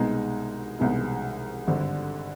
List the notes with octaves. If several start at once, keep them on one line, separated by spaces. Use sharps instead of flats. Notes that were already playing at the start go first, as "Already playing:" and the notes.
Already playing: C2 B2 G#3 B3 D#4
C2 B2 G#3 B3 D#4
G#1 G2 D3